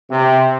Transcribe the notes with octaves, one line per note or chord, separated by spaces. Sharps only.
C3